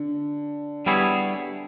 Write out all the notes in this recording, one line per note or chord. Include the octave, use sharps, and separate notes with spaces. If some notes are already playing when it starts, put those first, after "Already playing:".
Already playing: D3
G3 B3 E4 G#4 C#5